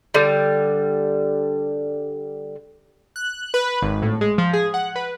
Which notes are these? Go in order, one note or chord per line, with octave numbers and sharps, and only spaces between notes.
D3 G3
F#6
B4
G#1
A2
G#3
F3
G#4
F#5
B4